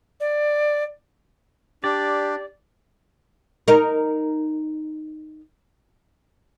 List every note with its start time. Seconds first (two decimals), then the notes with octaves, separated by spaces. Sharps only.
0.20 D5
1.84 D4 G4 D5
3.68 D#4 A#4